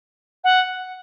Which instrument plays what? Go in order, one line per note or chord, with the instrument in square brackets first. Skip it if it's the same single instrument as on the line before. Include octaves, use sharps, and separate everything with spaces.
[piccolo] F#5